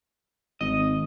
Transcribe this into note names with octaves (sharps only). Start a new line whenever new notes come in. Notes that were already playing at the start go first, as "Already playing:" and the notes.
G#1 D#5